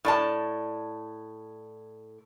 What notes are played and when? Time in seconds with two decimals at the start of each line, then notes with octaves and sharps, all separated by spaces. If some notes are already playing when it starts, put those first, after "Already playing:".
0.05 A2 D5 A5